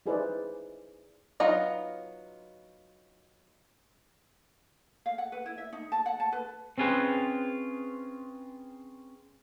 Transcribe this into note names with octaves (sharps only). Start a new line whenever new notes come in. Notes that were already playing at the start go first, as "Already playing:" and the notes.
D#4 E4 G#4 B4 C5 D5
F#3 B3 D#4 F4 D#5
F5
F#5
B4
E4
E5
D#4
A5
F#5
A5
B4
C4 C#4 F4 G#4 B4 C5